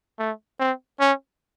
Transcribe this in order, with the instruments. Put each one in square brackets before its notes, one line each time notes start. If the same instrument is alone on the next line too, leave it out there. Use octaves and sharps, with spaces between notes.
[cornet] A3
C4
C#4